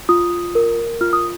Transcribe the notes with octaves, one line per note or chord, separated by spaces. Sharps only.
F4 D#6
A#4
F4 F6
D#6